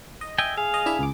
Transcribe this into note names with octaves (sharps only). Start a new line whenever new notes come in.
D#5
D#5 E5 G5 G#5
G#4 F5
D#5
D4 E4 E5
C#2 D6